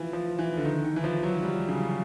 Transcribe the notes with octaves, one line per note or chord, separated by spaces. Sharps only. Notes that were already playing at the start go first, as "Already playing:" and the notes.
Already playing: E3 F3
F3
E3
D3
D#3
D#3
E3
F3
F#3
G3
C#3